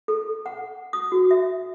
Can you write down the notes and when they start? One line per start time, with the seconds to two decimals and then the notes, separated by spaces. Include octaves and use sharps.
0.08 A4
0.46 F#5
0.93 D#6
1.12 F#4
1.31 E5